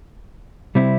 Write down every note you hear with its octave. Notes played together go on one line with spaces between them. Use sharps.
C3 G3 C4 E4